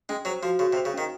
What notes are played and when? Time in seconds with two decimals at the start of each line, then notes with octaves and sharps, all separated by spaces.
0.09 G#3 C#4
0.25 F#3 C5
0.43 F3 F#4
0.59 C#3 F#4
0.73 C3
0.77 C5
0.85 C#3
0.94 D#3 C#4